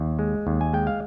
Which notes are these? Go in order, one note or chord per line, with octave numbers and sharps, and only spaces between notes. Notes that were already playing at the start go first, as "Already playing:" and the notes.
Already playing: D#2
G#3
D#2
G#5
G#3 G5
F5